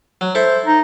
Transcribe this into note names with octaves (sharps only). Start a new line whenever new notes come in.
F#3
E4 A4 C5 E5
D#4